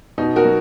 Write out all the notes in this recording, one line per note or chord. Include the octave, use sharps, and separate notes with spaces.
B2 D#4
F#4 A#4
F#3